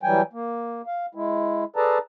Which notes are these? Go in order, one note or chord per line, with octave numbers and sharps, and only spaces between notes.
E3 F#3 G3 G5 G#5
A#3
F5
G#3 E4
G#4 A4 B4 D5 A5 A#5